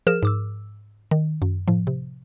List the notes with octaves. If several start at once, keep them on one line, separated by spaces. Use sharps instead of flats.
F3 G#4 A#4 F6 E7
G#2 D6 E6
D#3
F#2
A2 F3
C3